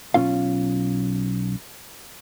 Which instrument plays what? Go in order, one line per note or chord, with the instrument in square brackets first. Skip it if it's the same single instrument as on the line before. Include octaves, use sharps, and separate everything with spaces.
[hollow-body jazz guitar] B1 F#2 C#4 F4 F5